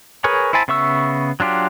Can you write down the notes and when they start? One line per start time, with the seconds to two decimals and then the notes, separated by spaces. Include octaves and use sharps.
0.24 G#4 A#4 B4 C#5 G#5
0.53 E4 C5 G#5 A5 B5
0.68 C#3 B3 E5 C#6 E6
1.40 F#3 D4 F4 G4